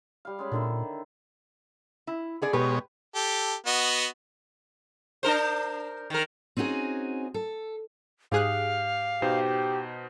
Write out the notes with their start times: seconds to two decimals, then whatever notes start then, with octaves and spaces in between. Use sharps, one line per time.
0.25 G3 F5
0.39 G#3 C#4 B5
0.52 A#2 D3 D#3 E5
2.07 E4
2.42 B3 G#4 D5
2.53 B2 G#3 G4 B4 C#5
3.15 G4 A4
3.66 B3 F#4 D#5
5.23 D4 A#4 C5
6.10 D#3 A#4
6.57 C4 C#4 D#4 F#4 G#4
7.34 A4
8.32 G#2 G4 G#4 F5 F#6
9.22 B2 D#4 G4 C5